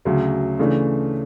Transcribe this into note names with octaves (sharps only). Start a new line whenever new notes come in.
D2 C#3 F#3
C#3 E3 A3 D4